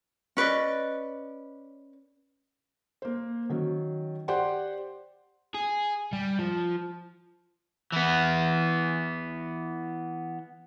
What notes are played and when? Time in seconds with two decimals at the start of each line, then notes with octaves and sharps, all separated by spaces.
0.37 C#4 B4 D5 D#5
3.02 A#3 C5
3.50 D#3 F#3 C#4
4.28 G4 C5 D5 F#5 G5 C6
5.54 G#4
6.13 G3
6.39 F3
7.92 E3 B3